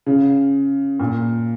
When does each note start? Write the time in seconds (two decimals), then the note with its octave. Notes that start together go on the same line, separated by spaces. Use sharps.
0.06 C#3
1.00 A#2